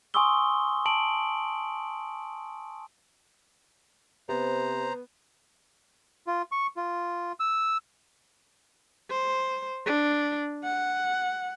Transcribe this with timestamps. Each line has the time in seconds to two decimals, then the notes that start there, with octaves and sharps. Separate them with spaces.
0.14 G#5 C6 C#6 D#6 E6 G7
0.86 A5 D7 F#7
4.29 C3 B3 C5 A#5
6.27 F4
6.52 C#6
6.77 F4
7.40 E6
9.11 C5
9.86 D4
10.64 F#5